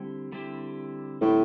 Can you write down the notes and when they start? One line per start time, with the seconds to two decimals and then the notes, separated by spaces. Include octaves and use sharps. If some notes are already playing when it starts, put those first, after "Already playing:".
Already playing: D3 G3 C4 E4 G4
0.32 D3 G3 C4 E4 G4
1.21 A2 D3 G3 C4 E4 G4